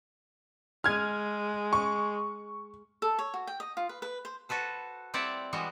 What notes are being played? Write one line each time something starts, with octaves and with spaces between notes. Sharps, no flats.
G#3 F6 G#6
C#6
A4
C#5
F#4
G5
D#5
F4
B4
B4
C5
F#4 A4 B4 C5
G3 C4 E4 D5 E5 F#5
E3 G3 G#3 B3 F#4